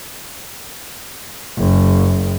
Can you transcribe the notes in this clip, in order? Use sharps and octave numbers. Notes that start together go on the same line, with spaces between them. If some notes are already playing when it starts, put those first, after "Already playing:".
F#1